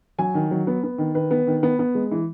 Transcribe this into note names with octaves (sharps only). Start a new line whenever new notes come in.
F#3 G#5
D#3
F#3
B3
B3
D#3
D#3 B4
B3
D#3
B3
B3
G#3
E3